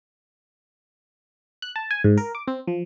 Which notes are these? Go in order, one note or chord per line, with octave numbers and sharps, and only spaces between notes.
F#6
A5
G#5
G#2
A#4
D6
C4
F3